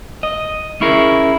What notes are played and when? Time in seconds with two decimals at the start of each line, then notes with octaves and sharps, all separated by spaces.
0.23 D#5
0.81 C#4 E4 G#4 A#4